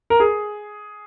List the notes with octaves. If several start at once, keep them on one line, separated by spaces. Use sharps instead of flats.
A#4
G#4